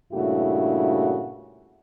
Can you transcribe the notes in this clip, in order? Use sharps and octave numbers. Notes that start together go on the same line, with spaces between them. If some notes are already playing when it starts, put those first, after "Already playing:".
G2 A#2 C#3 A3 E4 F#4